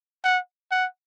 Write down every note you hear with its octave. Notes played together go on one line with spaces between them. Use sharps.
F#5
F#5